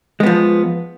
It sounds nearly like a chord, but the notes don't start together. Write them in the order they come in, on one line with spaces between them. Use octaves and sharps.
G#3 B3 F3